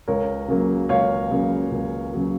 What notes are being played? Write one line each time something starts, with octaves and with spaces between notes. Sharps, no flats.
C#2 A#4 C#5
C#3 F#3 A#3
C#2 C#5 F5
C#3 F#3 A#3
C#2
C#3 F#3 A#3